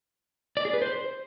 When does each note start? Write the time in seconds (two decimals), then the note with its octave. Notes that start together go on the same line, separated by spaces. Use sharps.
0.57 D5
0.65 G#4
0.73 B4
0.82 C5